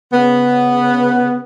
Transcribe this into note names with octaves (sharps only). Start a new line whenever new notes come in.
C#3 B3